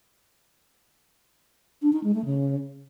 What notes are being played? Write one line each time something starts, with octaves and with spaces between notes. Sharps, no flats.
D4
D#4
G#3
A3
C#3